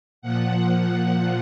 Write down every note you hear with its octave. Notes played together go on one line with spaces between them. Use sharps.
A#2 F3 F#5